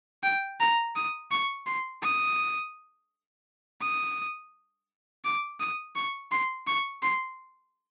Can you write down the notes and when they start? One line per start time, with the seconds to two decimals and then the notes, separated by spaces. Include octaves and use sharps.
0.24 G5
0.60 A#5
0.96 D#6
1.31 C#6
1.67 C6
2.03 D#6
3.82 D#6
5.25 D6
5.60 D#6
5.95 C#6
6.32 C6
6.67 C#6
7.03 C6